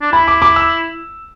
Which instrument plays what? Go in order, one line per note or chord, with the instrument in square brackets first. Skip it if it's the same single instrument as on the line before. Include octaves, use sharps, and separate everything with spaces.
[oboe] D4
[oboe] E4 [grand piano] B5
[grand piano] D6
D6
E6